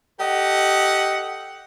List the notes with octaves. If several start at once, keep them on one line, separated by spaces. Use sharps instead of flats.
G4 A4 D#5 F#5